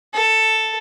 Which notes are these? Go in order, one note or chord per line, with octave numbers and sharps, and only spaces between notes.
A4